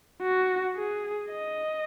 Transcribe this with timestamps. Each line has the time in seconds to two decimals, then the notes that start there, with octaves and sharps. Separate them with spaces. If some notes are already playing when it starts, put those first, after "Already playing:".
0.22 F#4
0.76 G#4
1.30 D#5